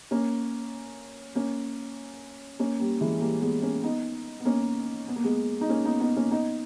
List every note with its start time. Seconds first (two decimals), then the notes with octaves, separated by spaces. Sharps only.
0.11 A#3 C#4
1.35 A#3 C#4
2.59 A#3 C#4
2.80 G3 A#3
3.01 E3 G#3
3.21 G3 A#3
3.42 G#3 B3
3.62 A#3 C#4
3.84 B3 D#4
4.40 B3
4.45 A#3 C#4
5.08 B3
5.16 A#3
5.24 G#3 B3
5.61 D#4
5.69 A#3 C#4
5.85 B3 D#4
6.00 B3 D#4
6.17 A#3 C#4
6.31 B3 D#4